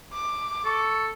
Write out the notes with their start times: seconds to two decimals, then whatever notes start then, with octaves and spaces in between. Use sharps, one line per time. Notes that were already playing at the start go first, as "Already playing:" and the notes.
0.13 D6
0.65 A4 C#6